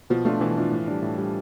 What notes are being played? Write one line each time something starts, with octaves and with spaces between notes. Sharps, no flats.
B2 F3
F3 A3 D4 F4
B2 E3
A3 D4 F4
A2
G3 D4
A2
G3 D4